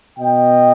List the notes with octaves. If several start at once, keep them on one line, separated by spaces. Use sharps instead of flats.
B2 D#5 G5